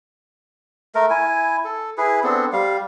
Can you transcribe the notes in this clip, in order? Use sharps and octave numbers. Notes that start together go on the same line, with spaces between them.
A3 A#4
E4 G#5
A4
E4 G#4 B4
B3 C4 D4 A4
G3 F5